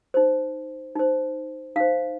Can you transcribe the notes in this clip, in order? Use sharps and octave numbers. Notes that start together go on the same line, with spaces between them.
D#4 C5
D#4 C5
D#4 C5 F5